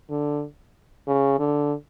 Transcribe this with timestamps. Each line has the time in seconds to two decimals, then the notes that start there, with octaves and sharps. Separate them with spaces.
0.10 D3
1.07 C#3
1.39 D3